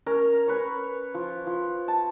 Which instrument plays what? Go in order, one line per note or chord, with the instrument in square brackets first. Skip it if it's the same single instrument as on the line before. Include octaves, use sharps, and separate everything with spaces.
[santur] C#4 A#4
C#4 B4 C#5
F3
F3
A5